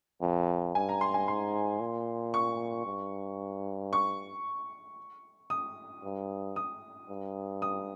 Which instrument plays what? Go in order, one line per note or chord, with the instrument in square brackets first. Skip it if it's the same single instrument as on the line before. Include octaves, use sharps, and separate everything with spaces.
[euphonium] F2
[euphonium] G2 [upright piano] G#5
[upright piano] A#5
C6
G#5
[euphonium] G#2 [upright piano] C6
[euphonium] A#2
[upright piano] C#6
[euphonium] G2
[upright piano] C#6
D#6
[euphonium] G2
[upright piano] D#6
[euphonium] G2
[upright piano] D#6